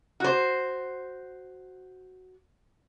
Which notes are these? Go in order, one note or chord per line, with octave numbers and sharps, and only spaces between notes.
F#4 C5